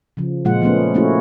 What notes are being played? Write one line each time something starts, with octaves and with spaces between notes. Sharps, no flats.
C#3 F3
A#2 F3 G#3 F4 F#5
F3 A3 B3 C#4
A3 A#3 C#4 E4 F#4